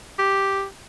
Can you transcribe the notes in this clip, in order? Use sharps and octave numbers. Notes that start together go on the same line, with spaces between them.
G4